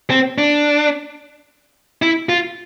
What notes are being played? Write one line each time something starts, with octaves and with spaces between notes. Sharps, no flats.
C4
D4
E4
F4